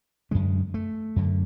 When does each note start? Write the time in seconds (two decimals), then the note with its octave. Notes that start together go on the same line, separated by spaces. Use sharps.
0.31 F#2 D3 G#3
0.74 A3
1.16 F#2 D3